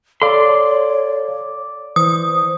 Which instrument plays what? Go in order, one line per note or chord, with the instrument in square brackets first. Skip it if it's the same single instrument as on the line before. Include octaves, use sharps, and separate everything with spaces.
[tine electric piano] A4 F5 [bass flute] C#5 [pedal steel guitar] D5 C6
[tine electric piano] E3 [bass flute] C5 [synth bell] D#6